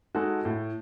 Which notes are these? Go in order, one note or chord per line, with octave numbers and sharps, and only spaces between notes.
G#3 D#4 F#4 A4
A2